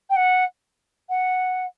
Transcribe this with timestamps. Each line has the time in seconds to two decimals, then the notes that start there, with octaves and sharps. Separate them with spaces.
0.10 G5
0.16 F#5
1.09 F#5